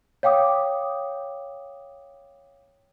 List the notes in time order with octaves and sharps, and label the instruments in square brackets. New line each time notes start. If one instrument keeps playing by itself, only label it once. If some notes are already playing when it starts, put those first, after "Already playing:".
[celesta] C#5 F5 G5 D6 D#6